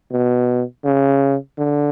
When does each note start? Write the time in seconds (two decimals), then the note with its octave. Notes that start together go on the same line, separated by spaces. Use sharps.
0.12 B2
0.84 C#3
1.58 D3